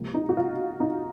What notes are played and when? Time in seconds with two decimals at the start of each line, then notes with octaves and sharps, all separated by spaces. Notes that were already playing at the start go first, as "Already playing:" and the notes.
Already playing: C#2 C3 F3 A#3
0.14 D#4
0.29 F#4
0.37 F4
0.80 D#4